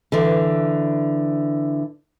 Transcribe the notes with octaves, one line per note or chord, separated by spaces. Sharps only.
D3 E3